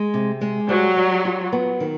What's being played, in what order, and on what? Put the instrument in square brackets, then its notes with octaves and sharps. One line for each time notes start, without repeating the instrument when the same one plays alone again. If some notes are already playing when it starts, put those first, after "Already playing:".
Already playing: [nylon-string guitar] G#3
C3
G#3
[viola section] F#3 [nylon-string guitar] G3
[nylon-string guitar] G3
F4
B3
D#3